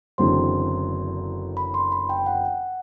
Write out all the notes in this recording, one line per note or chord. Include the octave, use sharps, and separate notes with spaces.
F#1 E2 D3 F#3 C4 C6
B5
C6
B5
G5
F#5